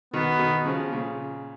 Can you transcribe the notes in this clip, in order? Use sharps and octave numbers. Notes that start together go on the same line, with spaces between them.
B2 D#3 B3
B2 D#3
C#3 F3
A#2 C#3